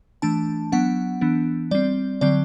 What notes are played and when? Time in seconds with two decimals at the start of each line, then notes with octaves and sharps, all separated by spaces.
0.22 E3 A3 D4 A5
0.72 F#3 B3 D4 F#5
1.21 E3 B3 D4
1.71 G3 C4 D5
2.21 D3 F#3 C4 D5